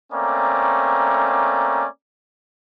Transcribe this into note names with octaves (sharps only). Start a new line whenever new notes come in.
A3 A#3 C4 C#4 D5 A#5